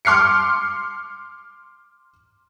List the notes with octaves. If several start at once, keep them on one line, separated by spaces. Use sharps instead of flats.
C6 D6 F6 C7 C#7